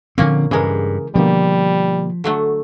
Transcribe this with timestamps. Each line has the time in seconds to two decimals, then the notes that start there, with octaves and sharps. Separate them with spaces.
0.18 A#2 D3 F3 A#3 C4 C#4
0.51 G2 C#3 E3 G#3 G#4 A#4
1.15 B2 D3 F3 G3 A#3
2.24 D3 F#3 A3